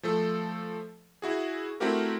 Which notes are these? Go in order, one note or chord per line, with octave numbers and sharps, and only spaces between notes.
F3 A3 A4
E4 F#4 G#4
A3 C4 E4 F#4 G4 A#4